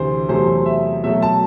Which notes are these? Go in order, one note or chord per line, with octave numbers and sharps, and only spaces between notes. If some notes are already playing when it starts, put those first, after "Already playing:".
Already playing: D2 C3 E3 C5
E2 C3 F#3 A3 C5
E5
B2 F#3 A3 E5
A5